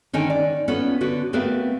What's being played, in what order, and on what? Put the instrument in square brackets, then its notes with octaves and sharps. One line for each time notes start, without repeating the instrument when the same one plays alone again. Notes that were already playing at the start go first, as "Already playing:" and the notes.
[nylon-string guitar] D3 D#3 C#4 G5 G#5
D5
B3 C#4 F4 A4 B4
D3 F#4 B4
A3 B3 C4 A#4 B4 F5